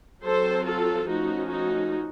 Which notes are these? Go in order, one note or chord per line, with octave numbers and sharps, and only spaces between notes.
F#3 C4 A4 C5
F4 A4
F3 A3 C#4 D#4 F#4
D#4 F#4